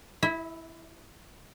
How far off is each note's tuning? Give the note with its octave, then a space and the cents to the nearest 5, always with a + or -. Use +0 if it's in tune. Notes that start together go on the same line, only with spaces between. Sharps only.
E4 +0 E5 -45